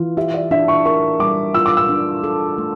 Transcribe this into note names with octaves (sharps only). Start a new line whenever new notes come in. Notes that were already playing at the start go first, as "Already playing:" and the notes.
Already playing: E3 F4
G4 E5
D5
D4 E5
C#6
A#4 C#6
G3 D6
F4 E6
D6
E6
D4
A4
A3